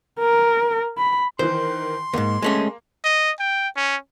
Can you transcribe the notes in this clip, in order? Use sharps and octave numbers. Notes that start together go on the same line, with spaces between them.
A#4
B5
D#3 E3 C5 C6
D2 G#2 A#3
G#3 A3 C#4
D#5
G5
C#4